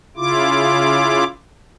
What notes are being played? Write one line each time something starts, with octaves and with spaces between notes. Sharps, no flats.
C#3 E4 F4 D6